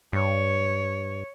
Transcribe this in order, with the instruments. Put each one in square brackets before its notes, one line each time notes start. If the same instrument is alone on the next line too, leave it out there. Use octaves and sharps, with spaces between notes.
[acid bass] G2 [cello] C#5